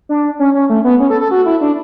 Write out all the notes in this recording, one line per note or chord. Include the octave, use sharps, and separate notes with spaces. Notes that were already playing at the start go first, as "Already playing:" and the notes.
D4
C#4
C#4
A3
B3
C#4
A4
A4
F#4
E4
D4